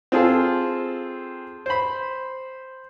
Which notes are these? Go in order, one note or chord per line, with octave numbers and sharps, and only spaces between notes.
C4 F4 G#4 A4
C5 B5